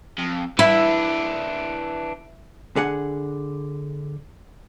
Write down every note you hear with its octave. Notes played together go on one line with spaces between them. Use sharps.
F2
E3 D4 E4
D3 G#4 F#5